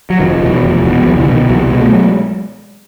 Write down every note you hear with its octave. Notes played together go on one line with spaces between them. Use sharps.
F#3
F1 D#3 F3
E2 B2
F1
E2 B2
G3
C2 E3 F#3
D3 E3
B2
D#3
C2 E3 F#3
B2 G#3
A3
F#3 G#3